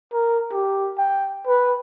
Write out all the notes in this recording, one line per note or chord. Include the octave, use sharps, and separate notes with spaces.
A#4
G4
G5
B4